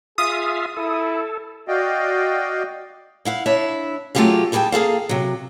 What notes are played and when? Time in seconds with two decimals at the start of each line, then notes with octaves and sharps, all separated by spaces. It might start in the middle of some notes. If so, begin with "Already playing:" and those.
0.18 F4 G#4 E5 F5 D#6
0.77 E4 A4
1.68 F#4 D5 D#5 F5 G5
3.25 E4 F5 F#5
3.46 D4 E4 C#5 E5
4.15 F#3 A3 F4 G4 G#4 F5
4.52 E2 G3 G#4 A#4 G5 A5
4.72 A#3 G#4 A4 F5
5.09 C3 F#3